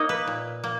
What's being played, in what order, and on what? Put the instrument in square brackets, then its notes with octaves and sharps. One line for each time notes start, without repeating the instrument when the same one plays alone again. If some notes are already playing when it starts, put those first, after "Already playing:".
Already playing: [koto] A#3 D#4 C#5 D#5
B4
A#2
A#3